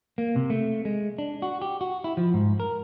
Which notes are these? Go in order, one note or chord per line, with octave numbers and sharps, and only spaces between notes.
A#3
C3
A3
G#3
D4
F#4
G4
F#4
E4
F3
G#2
A#4